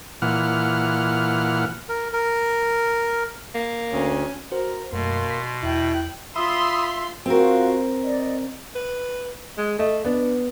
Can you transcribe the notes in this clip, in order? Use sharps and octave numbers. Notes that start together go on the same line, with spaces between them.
A#2 E3 F#5 F6
A#4
A#4
A#3
D2 C#4
F#4 A#4 C5
F#2 B2 A3 A#3 C6
B6
E2 E4 G5 F#6
F4 E5 B5 C6 D#6 E6
C4 F4 F#4 A#4 F5
D5 D#5
B4
G#3
A3 D#5
B3 D4